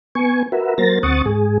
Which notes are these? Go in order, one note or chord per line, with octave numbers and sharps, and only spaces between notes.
B3 G#5 C#6
F#4 A#4 B4 E5
F#3 A#3 A#4 C5 A6 A#6
D2 C4 F#5 C#6 D#6 A6
G#2 G#4